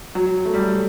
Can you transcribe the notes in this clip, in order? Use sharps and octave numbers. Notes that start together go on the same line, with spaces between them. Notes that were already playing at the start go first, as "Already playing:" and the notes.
F#3
A3
G3